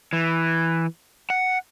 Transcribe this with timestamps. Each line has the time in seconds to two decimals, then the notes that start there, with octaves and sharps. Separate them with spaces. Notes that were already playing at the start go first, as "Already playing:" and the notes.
0.13 E3
1.30 F#5